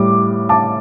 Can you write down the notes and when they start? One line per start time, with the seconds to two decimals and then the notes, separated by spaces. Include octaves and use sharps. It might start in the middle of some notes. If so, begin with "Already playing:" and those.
Already playing: A2 G3 D6
0.49 A5 D6